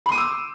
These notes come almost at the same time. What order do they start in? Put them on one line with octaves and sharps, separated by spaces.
B5 C6 D#7 D6 E6